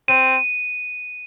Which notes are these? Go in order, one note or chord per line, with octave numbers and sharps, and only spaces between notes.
C4 D#7